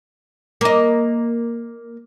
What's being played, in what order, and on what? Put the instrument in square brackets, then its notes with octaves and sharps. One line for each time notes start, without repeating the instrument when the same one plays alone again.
[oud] A#3 D#5